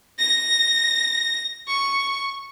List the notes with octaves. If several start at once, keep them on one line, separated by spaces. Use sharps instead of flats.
A#6
C#6